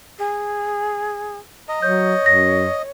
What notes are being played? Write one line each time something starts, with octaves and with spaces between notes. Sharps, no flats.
G#4
D#5 A#5
F#3 C#5 G6
F#2 A#6